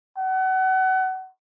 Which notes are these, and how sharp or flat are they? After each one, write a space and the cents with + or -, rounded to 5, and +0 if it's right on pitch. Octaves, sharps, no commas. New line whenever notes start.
F#5 +30